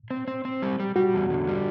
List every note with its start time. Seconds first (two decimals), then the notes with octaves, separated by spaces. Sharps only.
0.11 C4
0.28 C4
0.45 C4
0.62 G3
0.80 G3
0.96 G3 F#4
1.14 E2
1.30 D3
1.48 G3